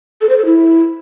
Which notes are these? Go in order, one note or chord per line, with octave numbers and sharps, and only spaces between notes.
A4
C5
A4
E4